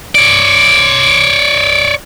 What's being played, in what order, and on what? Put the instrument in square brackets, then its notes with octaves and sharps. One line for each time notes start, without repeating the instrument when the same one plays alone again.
[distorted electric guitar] C#5 D5